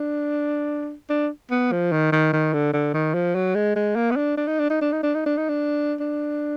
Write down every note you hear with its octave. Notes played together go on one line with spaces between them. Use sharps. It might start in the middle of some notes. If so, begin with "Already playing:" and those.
Already playing: D4
D4
B3
F3
D#3
D#3
D#3
D3
D3
D#3
F3
F#3
G#3
G#3
A#3
B3
D4
D4
D#4
D4
D#4
D4
D#4
D4
D#4
D4
D#4
D4
D4